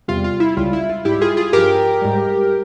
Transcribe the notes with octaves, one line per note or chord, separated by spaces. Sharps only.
E2 C3 G3 F4
F4
E4
C#2 C#3 G3 F4
E4
F4
G#2 G3 E4 G4
F4 G#4
F4 G#4
G2 F3 G4 A#4
G#2 G3